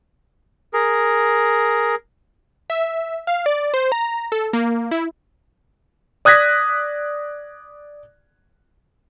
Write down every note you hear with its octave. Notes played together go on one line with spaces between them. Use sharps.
G#4 A#4
E5
F5
D5
C5
A#5
A4
A#3
E4
D5 D#6 F#6 G#6 A#6 B6